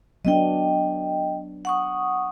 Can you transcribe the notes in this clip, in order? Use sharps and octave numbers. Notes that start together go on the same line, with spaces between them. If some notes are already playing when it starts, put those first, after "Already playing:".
F#3 B3 D4 D#5 G5
F#5 C#6 D#6